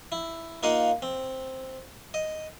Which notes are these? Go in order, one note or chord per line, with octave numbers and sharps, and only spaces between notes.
E4
A#3 D#4 F4 D#5 F5 F#5
C4
D#5